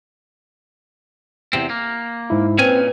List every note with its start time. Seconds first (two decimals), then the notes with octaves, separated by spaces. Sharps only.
1.53 E2 C3 C4
1.70 A#3
2.30 G#2 E4
2.58 A#2 C4 C#4 B4 G#5